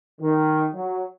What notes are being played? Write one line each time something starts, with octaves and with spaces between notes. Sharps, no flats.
D#3
F#3